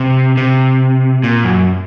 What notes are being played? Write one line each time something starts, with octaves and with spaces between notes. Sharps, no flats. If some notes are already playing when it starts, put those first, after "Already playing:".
Already playing: C3
C3
A#2
F#2